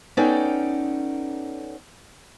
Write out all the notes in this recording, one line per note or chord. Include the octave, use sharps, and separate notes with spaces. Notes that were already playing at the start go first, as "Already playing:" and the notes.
B3 C#4 D#4 A4 D5 G5